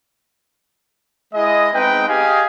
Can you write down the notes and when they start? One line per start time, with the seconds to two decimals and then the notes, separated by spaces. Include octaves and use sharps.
1.34 G#3 E4 G#4 D#5
1.74 G#3 B3 C4 D#4 B4 G5
2.08 G4 G#4 D#5 F5 G#5